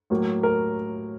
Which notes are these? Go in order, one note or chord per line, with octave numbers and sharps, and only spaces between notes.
A2 F#3 A#3
A#4